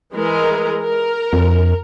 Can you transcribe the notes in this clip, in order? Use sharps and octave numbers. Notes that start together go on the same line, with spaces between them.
E3 G#3 A#4
A#4
F2